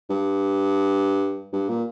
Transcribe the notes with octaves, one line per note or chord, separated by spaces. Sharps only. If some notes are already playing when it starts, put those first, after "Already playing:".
G2
G2
A#2